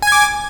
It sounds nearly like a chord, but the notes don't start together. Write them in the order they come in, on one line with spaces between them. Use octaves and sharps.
G#5 G#6 D6